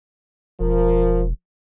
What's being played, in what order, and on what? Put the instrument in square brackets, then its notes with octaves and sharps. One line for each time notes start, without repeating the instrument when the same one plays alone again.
[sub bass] E1 [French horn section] F3 A#4